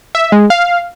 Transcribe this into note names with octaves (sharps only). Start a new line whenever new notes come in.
E5
G#3
F5